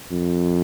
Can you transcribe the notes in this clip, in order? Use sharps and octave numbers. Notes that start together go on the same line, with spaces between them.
F2